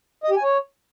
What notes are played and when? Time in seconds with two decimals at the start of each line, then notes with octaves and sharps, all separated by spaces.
0.24 D#5
0.30 G4
0.37 G#5
0.43 C#5